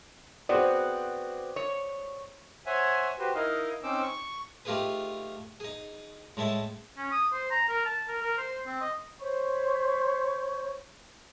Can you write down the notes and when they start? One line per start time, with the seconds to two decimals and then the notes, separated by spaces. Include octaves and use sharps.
0.49 B3 C4 F#4 G#4 C5 D5
1.56 C#5
2.66 C5 C#5 E5 F#5 G#5
3.19 F#4 G4 B4 C5
3.35 D#4 E4 A#4 D#5 F5
3.83 C4 C#4 D#4 C5 D6 E6
4.02 C#6
4.65 A3 D#4 F4 G4 G#4 B4
5.60 D#4 G#4
6.37 A2 G#3 A4 E5 A5
6.98 C#4
7.12 D#6
7.33 C5
7.51 A#5
7.69 A#4
7.86 A5
8.08 A#4
8.22 A#4
8.38 C5
8.66 C4
8.81 D#5
9.20 C5 C#5 B5 C#6